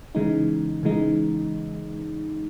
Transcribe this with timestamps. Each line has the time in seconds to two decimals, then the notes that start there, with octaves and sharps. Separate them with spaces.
0.15 C#3 E3 G#3 D#4
0.83 C#3 E3 G#3 D#4